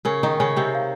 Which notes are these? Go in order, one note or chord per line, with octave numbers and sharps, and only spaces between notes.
C#3 C#4 A#4
D#3 D#4
C#3 C#4 C#5
C3 C4
F5